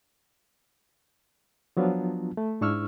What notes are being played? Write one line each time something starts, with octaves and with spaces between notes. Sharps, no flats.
F3 F#3 B3 D4 F4
A3
G#2 D4 E4 C#6 E6 F6